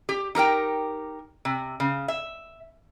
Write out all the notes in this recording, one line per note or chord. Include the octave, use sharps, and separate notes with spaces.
G4
D#4 G4 A#4 G5
C3
C#3
E5